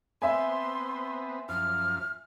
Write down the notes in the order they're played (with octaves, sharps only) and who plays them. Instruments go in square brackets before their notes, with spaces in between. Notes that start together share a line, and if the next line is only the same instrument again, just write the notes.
[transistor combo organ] B3 C4 [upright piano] E5 G#5 [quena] C6
[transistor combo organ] F#2 F3 [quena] F6